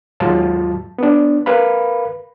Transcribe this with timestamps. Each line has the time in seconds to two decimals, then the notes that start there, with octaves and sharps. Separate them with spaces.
0.20 D#2 G#2 F#3 F4 A5
0.98 B3 D4
1.46 A#4 B4 F5 B5